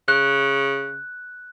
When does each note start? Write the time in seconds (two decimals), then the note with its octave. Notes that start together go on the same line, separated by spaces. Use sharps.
0.08 C#3 F#6